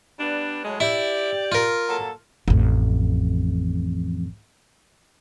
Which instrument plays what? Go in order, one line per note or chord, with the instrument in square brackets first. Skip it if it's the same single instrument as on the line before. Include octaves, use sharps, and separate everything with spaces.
[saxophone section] G3 B3 D4
A2 F#3 G#3
[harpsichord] E4 [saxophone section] G4 D5
[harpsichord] F4 A#4
[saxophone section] F#3 A#3 A4
[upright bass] A1 F2